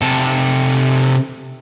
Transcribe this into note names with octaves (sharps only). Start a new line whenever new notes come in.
C3 A4